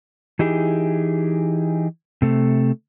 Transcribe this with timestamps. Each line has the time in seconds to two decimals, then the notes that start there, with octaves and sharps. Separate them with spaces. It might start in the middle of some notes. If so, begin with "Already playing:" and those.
0.39 E3 D#4 E4 G4 G#4
2.22 C3 A3